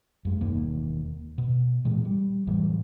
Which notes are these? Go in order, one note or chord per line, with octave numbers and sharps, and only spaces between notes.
F#2 G#3
E1 D#2 D#3 A#3
B2
A#2 E3 G#3
G3
A2 E3 F#3 G3